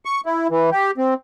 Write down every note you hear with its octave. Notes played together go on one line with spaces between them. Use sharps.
C#6
E4
E3
G4
C4